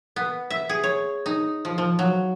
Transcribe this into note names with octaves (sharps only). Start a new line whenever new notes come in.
B3
E5
G#4
C#5
D#4
F3
F3
F#3